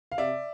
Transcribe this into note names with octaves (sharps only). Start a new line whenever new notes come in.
F5
C3 D5 E5